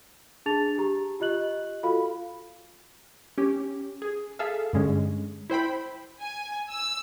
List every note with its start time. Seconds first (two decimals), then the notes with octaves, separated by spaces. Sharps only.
0.46 D4 G#4 A5 A6 F7
0.78 G4 A#5
1.20 F4 G4 D#5 F#6 F#7
1.83 F4 F#4 A4 F5 B5
3.38 C#4 G4
4.02 G#4
4.39 G#4 A4 E5 F5
4.73 G2 D3 G#3 C#4
5.50 E4 C5 G5 B5
6.21 G#5
6.72 E6